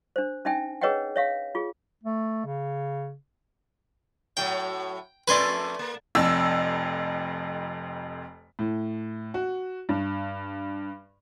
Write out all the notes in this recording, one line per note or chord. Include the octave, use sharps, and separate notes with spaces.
D4 C5
C#4 D#4 E5 G5 G#5
G#4 B4 C#5 D#5 F#5 G5
C#5 E5 F5
F4 G#4
A3
C#3
A2 F#3 G5
F2 A3 B4 D5 G#5 C6
A#3
F1 F2 E6
A2
F#4
G2